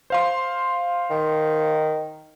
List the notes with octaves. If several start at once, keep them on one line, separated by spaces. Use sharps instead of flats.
C5 F5 C6
D#3